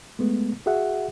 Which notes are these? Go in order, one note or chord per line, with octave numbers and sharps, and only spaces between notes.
G#3 A3 B3
F#4 G#4 E5 F#5